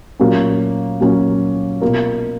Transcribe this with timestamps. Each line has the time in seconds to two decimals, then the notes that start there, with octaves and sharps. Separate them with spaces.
0.19 A#2 F#3 A#3 C#4 F#4
1.00 A#2 F#3 A#3 C#4 F#4
1.82 B2 A#3 F4 A#4